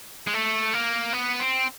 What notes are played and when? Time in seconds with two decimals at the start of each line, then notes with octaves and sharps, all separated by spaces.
0.27 G#3
0.34 A3
0.74 A#3
1.13 B3
1.40 C4